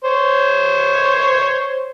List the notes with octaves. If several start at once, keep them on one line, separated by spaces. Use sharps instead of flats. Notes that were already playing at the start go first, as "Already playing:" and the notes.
C5 C#5